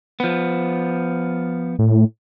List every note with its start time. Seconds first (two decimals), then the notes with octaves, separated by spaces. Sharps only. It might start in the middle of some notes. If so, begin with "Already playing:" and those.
0.20 F3 B3
1.79 A2